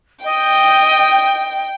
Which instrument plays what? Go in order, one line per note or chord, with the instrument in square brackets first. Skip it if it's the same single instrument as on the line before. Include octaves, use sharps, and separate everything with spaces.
[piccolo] D#5 [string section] G5